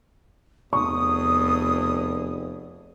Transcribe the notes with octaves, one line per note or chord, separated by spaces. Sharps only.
F1 E2 C#6 D#6